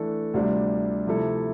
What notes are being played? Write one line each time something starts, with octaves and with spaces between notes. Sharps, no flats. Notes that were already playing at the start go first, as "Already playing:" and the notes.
Already playing: E3 A3 D4 A4
D2 C3 G3 D4 F4
C3 F3 A3 E4 A4